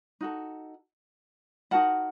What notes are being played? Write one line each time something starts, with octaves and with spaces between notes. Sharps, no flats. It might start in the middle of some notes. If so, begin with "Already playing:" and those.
D#4 F#4 A4
D#4 F#4 A#4 F#5 A5